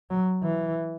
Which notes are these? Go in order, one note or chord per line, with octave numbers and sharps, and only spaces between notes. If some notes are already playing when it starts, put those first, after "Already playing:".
F#3
E3